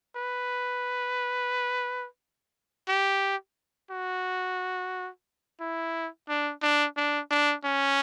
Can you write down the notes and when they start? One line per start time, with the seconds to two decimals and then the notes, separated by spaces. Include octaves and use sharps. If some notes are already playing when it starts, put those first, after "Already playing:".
0.16 B4
2.88 G4
3.91 F#4
5.60 E4
6.29 D4
6.62 D4
6.97 D4
7.31 D4
7.65 C#4